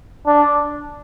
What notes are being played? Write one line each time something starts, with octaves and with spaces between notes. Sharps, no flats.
D4